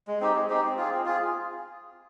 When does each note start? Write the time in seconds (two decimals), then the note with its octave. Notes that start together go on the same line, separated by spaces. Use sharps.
0.08 G#3
0.21 C4 D#4 G4
0.35 G#3
0.49 C4 D#4 G4
0.63 C4
0.77 F4 G#4
0.91 C4
1.05 F4 G#4